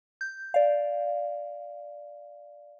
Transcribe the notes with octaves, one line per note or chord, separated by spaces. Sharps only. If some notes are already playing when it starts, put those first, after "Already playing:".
G6
D5 F5